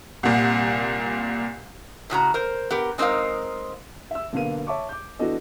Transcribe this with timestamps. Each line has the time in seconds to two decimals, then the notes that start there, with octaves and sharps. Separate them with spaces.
0.23 C2 A#2
2.10 A2 C#3 F#4 A#5
2.34 A#4 C5
2.70 B3 G4 A#4
2.98 G#3 C4 D#4 G#4 A#4 F5
4.11 E5 E6
4.33 B1 D3 A#3 B3 F5 D#7
4.67 C#5 E5 A5 C#6 D6
4.89 D6 G6
5.19 E3 B3 D4 F#4 A4 D#5